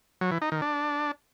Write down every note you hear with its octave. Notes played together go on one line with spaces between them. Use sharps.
F#3
E3
D#4
D#3
D4